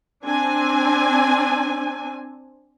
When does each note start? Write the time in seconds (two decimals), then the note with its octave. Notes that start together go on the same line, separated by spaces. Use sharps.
0.24 C4 D4 G#5